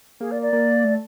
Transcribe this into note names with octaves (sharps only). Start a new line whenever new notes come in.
A#3 G#4
D5
D5
A#3
A3